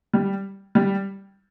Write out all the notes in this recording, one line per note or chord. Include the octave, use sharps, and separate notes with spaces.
G3
G3